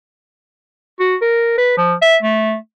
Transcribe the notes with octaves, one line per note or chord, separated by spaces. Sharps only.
F#4
A#4
B4
F3
E5
A3